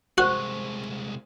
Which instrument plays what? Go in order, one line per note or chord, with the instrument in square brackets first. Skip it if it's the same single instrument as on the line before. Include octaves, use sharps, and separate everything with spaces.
[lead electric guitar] C2 G#3 [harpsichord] F#4 [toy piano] C5 C#6 [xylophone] F#6